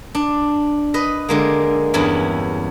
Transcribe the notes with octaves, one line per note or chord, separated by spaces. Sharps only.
D4
B4 D#5
D3 G#3 A#3
E2 G2 C#4 E4